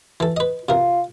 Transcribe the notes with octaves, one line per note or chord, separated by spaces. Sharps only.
E3 A4
B4 D#5
C3 F4 A#4